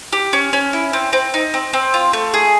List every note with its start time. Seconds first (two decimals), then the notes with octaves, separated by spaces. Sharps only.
0.13 G4
0.33 C#4
0.53 C#4
0.73 E4
0.93 C4
1.13 C4
1.34 D#4
1.54 C4
1.73 C4
1.94 F4
2.13 A3
2.34 G#4